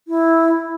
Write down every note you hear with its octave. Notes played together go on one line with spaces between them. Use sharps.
E4